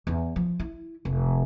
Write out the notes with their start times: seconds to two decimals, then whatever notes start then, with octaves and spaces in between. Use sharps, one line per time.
0.07 E2
0.36 F3
0.59 E4
1.05 F1